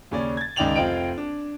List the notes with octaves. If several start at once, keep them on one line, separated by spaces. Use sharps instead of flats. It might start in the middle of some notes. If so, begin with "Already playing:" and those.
D#2 C#3 C#4 D5
G#6 A6
C#2 D#3 D5 G5 F7 F#7
F1 F4 C5 D#5 G5 D7
D4